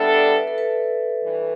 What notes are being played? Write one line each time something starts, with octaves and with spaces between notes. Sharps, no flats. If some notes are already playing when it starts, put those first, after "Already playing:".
Already playing: G3 B3 D4 A4 E5
D5
B4
A4
B4
G2 E3